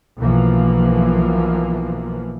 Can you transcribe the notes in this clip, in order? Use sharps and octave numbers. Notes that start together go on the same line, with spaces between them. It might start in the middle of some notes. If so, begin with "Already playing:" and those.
B1 E3 F3 A#3